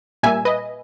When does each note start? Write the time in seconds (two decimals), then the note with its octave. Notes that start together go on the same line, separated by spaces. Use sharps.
0.23 A#2 G3 A#3 E5 G#5
0.45 B4 D#5